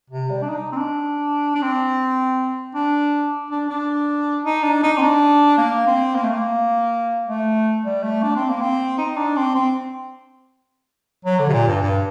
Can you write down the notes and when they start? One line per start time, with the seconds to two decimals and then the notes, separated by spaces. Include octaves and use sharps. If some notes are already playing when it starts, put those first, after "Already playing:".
0.10 C3
0.30 G3
0.42 D4
0.49 D#4
0.72 C4
0.77 D4
1.55 D4
1.62 C4
2.75 D4
3.51 D4
3.69 D4
4.45 D#4
4.63 D4
4.83 D#4
4.97 C4
5.02 D4
5.58 A#3
5.87 C4
6.15 A#3
6.23 A3
6.32 A#3
7.28 A3
7.84 G3
8.03 A3
8.23 D4
8.36 C4
8.49 A#3
8.61 C4
8.98 D#4
9.17 D4
9.37 C4
9.55 C4
11.25 F#3
11.39 D3
11.49 C3
11.53 A#2
11.68 G2
11.82 G2